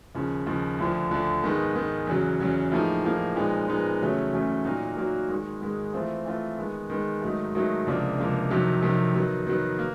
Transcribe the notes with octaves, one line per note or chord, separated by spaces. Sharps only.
D#2 C#3 F3
D#2 C#3 F3
D2 D3 F3
D2 D3 F3
G#2 D#3 G#3 B3
G#2 D#3 G#3 B3
E2 C#3 F#3
E2 C#3 F#3
A2 F3 A#3 D#4 G#4
A2 F3 A#3 D#4 G#4
A#2 F3 G#3 B3 D#4
A#2 F3 G#3 B3 D#4
E2 C#3 F#3 A3 C#4
E2 C#3 F#3 A3 C#4
A#2 F#3 A#3 D#4 F#4
A#2 F#3 A#3 D#4 F#4
G#2 D#3 G#3
G#2 D#3 G#3
E3 A3 C4 F4
E3 A3 C4 F4
D#3 G#3 B3
D#3 G#3 B3
G#2 D#3 F#3 A3
G#2 D#3 F#3 A3
C#2 C3 F3 A#3 D4
C#2 C3 F3 A#3 D4
F2 C3 D#3 F#3
F2 C3 D#3 F#3
D#3 F#3 B3
D#3 F#3 B3
A#3